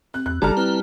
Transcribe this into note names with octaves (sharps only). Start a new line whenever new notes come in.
C4 F#6
E2 F#6
G1 C#3 G3 D4 A4 A5 A#5 F6
C4 E4 B4